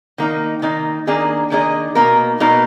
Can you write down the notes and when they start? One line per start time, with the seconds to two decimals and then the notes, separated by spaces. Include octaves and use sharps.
0.18 D#3 A#3 D#4
0.62 D#3 A#3 D#4
1.07 D#3 A#3 D4 G#4 D#5
1.51 D#3 A#3 D4 G#4 D#5
1.95 B2 A#3 D#4 A#4
2.40 B2 A#3 D#4 A#4